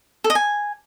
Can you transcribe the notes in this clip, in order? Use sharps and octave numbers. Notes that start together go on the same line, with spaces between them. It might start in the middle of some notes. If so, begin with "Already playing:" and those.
A4
D#5
G#5